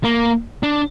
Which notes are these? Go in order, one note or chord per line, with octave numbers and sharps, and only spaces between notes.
A#3
D4